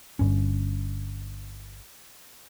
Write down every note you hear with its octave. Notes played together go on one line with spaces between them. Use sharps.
G1 G2 C#4